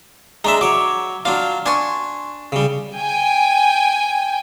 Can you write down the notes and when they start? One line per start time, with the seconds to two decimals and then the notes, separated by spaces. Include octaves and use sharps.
0.44 G#3 D4 E5 A#5
0.61 F#3 C#5 D6
1.25 F#3 D4 F4 F5
1.66 D4 G#5 C6 C#6
2.52 C#3 G3
2.95 G5 G#5